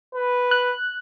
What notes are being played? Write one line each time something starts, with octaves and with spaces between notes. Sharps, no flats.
B4
F#6